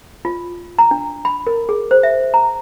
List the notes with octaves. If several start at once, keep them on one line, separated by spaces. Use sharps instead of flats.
F4
A#5
D4
B5
A#4
G#4
C5
E5
A#5